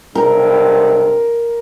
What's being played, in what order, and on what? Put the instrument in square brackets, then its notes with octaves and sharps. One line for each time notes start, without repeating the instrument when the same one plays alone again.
[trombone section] B1 G2 C3 [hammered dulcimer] A#4